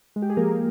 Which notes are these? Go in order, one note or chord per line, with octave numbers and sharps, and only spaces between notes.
G#3
G4
G#4
F3 A#3 A#4